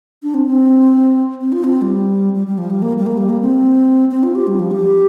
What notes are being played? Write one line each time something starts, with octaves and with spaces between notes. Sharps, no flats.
D4
C4
C4
C4
F4
C4
G3
G3
G3
F3
G3
A#3
G3
A#3
G3
A#3
C4
C4
F4
G4
G3
F3
G4